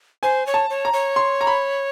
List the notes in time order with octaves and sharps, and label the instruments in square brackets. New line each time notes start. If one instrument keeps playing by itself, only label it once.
[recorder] C5 [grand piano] G#5
[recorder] C#5
[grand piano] A5
[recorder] C#5
[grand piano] A#5
[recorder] C#5
[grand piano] C6
A#5
B5